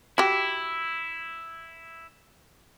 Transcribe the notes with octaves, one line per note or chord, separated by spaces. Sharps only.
E4 F#4 G4